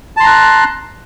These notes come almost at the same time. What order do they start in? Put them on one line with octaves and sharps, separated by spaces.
A5 C6 A#5 F#6